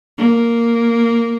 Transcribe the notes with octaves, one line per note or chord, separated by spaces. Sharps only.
A#3